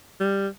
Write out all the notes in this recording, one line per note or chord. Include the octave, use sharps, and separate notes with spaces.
G3